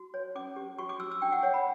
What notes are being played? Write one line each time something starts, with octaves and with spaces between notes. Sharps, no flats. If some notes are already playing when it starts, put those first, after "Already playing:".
Already playing: F#4
C#5
C#4 D6
G4
F#4 C#6
D6
F#4 E6
E6
D4 G5
F#5
C#5 F#5
B5